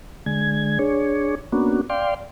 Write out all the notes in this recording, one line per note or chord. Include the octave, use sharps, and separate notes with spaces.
D3 G#3 G#6
D4 G#4 C#5
A#3 B3 C#4 D4 F#4
D5 F5 G5 C6